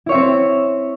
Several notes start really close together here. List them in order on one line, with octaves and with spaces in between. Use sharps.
E4 C#5 E5 C4